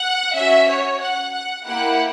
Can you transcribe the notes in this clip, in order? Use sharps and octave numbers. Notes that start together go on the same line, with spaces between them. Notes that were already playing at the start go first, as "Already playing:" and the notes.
Already playing: F#5
C#4 F#4 E5
C#5
F#5
F#5
A#3 E4 G4 F#5